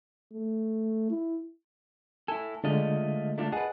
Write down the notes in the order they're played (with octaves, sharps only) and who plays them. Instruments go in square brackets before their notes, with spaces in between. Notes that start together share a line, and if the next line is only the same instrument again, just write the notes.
[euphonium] A3
E4
[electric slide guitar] E4 A4 [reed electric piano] G#5
[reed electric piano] D3 G#3 [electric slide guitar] A3 F4 D#5
[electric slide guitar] A3 D4 F4
[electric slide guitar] G#4 B4 [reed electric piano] D#5 F#5 A5